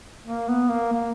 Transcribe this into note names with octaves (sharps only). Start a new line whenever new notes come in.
A#3
B3
A#3
A#3